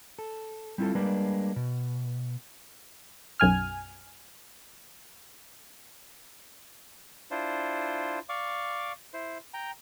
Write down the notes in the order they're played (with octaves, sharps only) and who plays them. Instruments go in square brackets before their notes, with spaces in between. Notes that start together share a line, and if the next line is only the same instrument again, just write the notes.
[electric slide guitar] A4
G3 C4 E4 F4 A4
G3 G#3 A#3 D4 B4
B2
[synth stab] B1 F#2 G#5 F6
[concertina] D4 E4 F4 C5
D5 F5 C#6 D6
E4 C5
G5 A#5